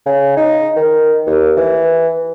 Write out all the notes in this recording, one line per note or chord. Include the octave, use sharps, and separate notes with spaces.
C#3
D#4
D#3
D#2
E3